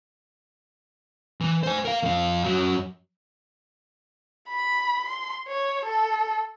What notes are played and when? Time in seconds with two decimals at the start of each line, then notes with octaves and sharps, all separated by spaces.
1.41 E3
1.63 C5 G#5
1.85 A#4 F5
2.03 F2 F5
2.44 F#2 F#3
4.49 B5
5.06 C6
5.48 C#5
5.86 A4